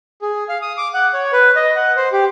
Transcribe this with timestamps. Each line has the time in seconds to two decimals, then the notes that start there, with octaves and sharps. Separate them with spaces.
0.22 G#4
0.49 F5
0.62 D#6
0.78 D6
0.94 F#5
1.14 C#5
1.33 B4
1.56 D#5
1.76 F#5
1.97 C5
2.13 G4